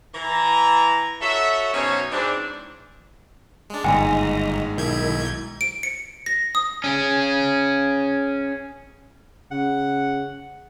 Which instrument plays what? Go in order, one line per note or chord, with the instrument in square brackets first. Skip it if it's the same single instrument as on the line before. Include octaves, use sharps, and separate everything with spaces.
[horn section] E3 A#5
F#4 A4 C#5 E5
B2 F#3 C#4 D#4 C5 C#5
G#2 E3 C4 D4
[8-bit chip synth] G#3 D4
[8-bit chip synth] G1 [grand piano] D#2 G#2 [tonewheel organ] D#5 A#5 [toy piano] G5 G#5
[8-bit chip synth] B1 G6 G#6 [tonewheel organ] D#3 E4
[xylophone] D7
C#7
A#6
D#6
[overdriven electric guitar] C#4 G#4
[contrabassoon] C#3 [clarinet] F#5